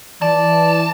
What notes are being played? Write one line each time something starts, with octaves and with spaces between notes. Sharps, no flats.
E3 D5 A5